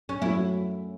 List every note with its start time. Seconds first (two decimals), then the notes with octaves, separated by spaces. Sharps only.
0.09 C#4
0.21 F#2 F#3 A3 C#4 E4 F#4